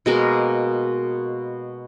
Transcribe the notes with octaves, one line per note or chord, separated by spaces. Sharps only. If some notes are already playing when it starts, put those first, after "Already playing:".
B2 G#3 A#3 A#4